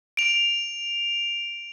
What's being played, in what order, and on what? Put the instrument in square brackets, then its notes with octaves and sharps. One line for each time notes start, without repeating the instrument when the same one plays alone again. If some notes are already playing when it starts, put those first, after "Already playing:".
[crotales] D7 F7